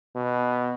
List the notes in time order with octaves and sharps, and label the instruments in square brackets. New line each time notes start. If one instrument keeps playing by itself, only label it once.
[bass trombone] B2